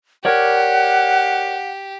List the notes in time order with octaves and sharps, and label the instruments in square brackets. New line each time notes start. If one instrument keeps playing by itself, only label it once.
[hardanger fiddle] G4 [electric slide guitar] A#4 C#5 D5 [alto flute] F#5